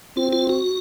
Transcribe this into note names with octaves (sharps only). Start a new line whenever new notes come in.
C4 F4
F4
F#4